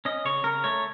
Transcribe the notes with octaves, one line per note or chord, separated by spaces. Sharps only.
C#4 D#5
C#3 C#5
C#3 A#4
A3 C#5